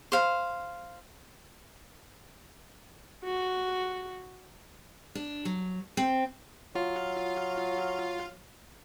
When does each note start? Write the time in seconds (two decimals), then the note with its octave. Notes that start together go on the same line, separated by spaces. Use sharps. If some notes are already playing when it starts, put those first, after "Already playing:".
0.12 C5 F5
3.24 F#4
5.15 D4
5.45 F#3
5.97 C4
6.75 F#3 F4 F5